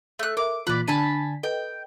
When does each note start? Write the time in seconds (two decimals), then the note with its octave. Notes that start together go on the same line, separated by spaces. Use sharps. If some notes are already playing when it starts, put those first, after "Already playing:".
0.19 A3 F#6
0.37 A#4 E5 D6
0.67 A#2 E3 F4 B4 D5
0.88 D3 D4 G#5 A5 B5 B6
1.43 A4 B4 D#5 G5